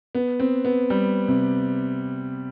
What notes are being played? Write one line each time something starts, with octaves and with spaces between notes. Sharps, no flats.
B3
C4
B3
G3
C3